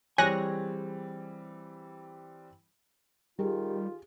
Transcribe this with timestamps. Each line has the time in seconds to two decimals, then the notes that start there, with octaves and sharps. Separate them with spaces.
0.18 E3 G3 C4 G#4 C#5 G#5 F#6 A#6
3.39 D#3 G3 F4 G4 G#4